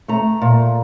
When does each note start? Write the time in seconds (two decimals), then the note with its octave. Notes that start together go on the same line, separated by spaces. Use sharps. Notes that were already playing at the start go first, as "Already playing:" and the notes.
0.08 A3 A#5
0.42 A#2